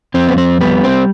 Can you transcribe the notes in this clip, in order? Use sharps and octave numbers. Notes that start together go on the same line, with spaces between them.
F2 C4
B3
C4
G3 B3
C4